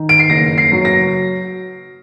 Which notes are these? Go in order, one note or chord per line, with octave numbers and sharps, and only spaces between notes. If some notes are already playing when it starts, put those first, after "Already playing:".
Already playing: D#3
D7
C7
F#1 A#6
C7
F#3
A#6